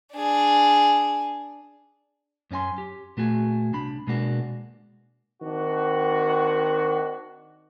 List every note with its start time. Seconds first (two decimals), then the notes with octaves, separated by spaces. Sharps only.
0.13 D4 G#4
2.51 F#2 C#4 D4 G#5 C6
2.78 G4
3.17 A#2 A3 F#4 G#4
3.73 C2 D4 B5
4.07 B2 G#3 A#3 D4 F#4
5.42 D#3 C4 D4 F#4